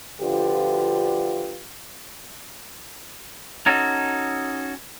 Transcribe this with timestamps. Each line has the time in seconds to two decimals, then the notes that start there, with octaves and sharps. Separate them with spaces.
0.20 D2 D3 F3 F4 G4 B4
3.66 C#4 D#4 F#4 A4